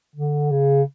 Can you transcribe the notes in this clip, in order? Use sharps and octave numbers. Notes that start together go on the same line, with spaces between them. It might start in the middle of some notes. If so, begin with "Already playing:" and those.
D3
C#3